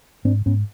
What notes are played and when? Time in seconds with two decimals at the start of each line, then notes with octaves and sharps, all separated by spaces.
0.25 G#2 C4 D4
0.46 G#2 B3 C#4